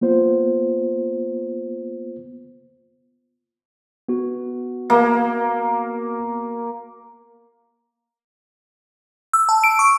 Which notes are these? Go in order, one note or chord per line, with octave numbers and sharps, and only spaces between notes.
A#3 B3 F4 C5
B3 F#4
A#3
E6
A5
D7
C#6